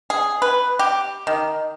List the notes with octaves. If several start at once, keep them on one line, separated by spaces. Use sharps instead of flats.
G#4
B4
G4
D#3